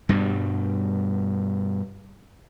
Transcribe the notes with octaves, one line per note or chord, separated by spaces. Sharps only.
G2 B2 G3